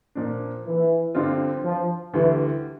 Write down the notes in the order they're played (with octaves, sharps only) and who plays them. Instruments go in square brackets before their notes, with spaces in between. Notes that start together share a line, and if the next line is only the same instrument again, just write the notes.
[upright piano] A#2 F3 A#3 D4
[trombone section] E3
[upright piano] G2 D3 F3 C4 F4
[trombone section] F3
[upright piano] D2 D3 G3 [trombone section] E3